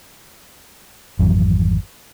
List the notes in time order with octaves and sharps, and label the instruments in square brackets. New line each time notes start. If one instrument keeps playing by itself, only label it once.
[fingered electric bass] G#1 F2 E3 F#3